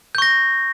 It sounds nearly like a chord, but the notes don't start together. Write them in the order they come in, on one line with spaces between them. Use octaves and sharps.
G6 C#6 A#6